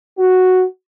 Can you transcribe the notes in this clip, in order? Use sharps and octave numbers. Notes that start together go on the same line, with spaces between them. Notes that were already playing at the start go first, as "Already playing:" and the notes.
F#4